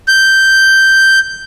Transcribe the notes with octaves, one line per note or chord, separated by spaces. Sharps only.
G6